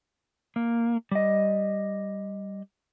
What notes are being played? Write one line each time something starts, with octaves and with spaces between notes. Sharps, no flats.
A#3
G3 D#5